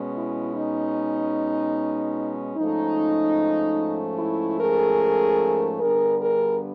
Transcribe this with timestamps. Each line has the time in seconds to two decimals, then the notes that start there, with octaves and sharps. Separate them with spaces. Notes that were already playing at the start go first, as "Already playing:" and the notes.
Already playing: B2 G#3 C#4
0.16 E4
0.56 D#4
2.57 G#2 F3 A3 C#4 D#4
4.19 E4
4.59 G#4 A#4
5.80 G2 D3 G3 B3 D4 G#4 A#4
6.21 G#4 A#4